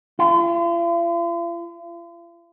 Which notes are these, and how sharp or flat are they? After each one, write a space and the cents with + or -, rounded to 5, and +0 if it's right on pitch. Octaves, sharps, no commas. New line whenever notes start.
F4 -45